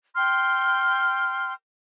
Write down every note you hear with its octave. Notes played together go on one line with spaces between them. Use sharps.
G5 C6 F6